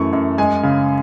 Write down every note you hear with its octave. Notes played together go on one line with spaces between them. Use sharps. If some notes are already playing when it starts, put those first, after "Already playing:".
Already playing: F#2 E3 A3 C#6
F#2
G#3 G#5
C#3